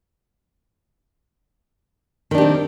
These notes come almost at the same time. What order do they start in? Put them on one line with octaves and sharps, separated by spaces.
D#3 D4 G4 C4